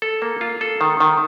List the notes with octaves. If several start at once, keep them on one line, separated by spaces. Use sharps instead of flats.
A4
A#3
F4
A4
D#3
D#3